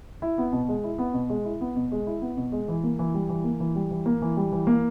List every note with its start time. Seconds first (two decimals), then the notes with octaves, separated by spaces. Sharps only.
0.22 E4
0.38 B3
0.53 B2
0.69 G#3
0.84 E4
0.98 B3
1.14 B2
1.30 G#3
1.45 E4
1.61 B3
1.76 B2
1.92 G#3
2.07 E4
2.22 B3
2.37 B2
2.52 G#3
2.68 E3
2.83 A#3
2.99 E3
3.14 G3
3.29 E3
3.44 A#3
3.60 E3
3.75 G3
3.91 E3
4.06 A#3
4.22 E3
4.37 G3
4.52 E3
4.67 A#3